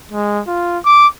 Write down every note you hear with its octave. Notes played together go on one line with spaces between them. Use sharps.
G#3
F4
D6